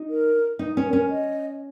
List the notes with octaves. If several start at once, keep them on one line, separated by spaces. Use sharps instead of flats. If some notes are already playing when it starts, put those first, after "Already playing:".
Already playing: D#4
A#4
D#4
C#4
A#4
C#4
D#5